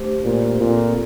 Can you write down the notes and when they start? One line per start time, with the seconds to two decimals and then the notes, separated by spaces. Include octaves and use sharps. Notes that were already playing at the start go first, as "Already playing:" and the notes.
Already playing: A3 D4 G4 C5
0.24 A#2
0.60 A#2 C4 F4 A4